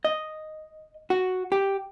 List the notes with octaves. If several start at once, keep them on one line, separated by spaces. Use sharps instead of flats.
D#5
F#4
G4